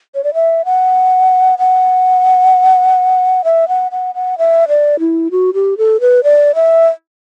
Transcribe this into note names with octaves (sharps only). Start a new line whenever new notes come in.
C#5
D5
E5
F#5
F#5
E5
F#5
F#5
F#5
E5
D5
E4
F#4
G4
A4
B4
D5
E5